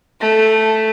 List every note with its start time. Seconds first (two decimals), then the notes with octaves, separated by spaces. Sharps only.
0.20 A3